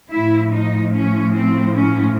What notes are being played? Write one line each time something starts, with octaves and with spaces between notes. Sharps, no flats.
A2 F3 E4
D#4
C#4
C4
C#4